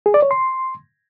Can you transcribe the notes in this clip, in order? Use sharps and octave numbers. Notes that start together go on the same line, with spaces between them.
G#4
D5
C#5
C6